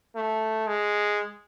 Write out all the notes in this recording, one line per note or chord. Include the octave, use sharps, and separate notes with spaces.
A3
G#3